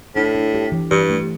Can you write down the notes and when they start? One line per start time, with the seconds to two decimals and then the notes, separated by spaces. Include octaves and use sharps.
0.16 A2 D4
0.35 D4
0.54 G4
0.72 E3
0.91 G2 E3
1.09 A3